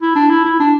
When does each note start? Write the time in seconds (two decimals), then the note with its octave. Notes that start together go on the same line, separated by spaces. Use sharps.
0.02 E4
0.15 D4
0.30 E4
0.45 E4
0.60 D4